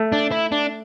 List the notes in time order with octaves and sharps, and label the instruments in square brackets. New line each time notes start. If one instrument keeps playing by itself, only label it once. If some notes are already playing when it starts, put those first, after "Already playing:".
Already playing: [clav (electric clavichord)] A3
[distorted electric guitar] D4
E4
D4